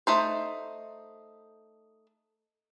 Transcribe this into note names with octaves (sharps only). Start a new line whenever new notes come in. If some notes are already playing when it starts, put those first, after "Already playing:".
A3 D#4 C5